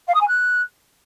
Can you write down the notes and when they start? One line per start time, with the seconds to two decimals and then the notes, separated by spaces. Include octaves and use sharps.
0.07 F5
0.14 D#6
0.21 G#5
0.27 F#6